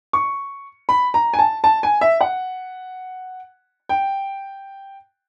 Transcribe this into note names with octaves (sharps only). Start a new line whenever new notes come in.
C#6
B5
A#5
G#5
A5
A5
G#5
E5
F#5
G5